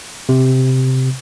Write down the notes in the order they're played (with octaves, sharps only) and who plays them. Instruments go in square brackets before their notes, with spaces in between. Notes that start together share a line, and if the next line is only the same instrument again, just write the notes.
[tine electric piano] C3